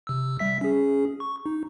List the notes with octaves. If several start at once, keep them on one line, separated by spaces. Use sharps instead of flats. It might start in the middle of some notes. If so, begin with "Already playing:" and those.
C3 E6
G3 E5 B6
C#4 G#4
C#6
D#4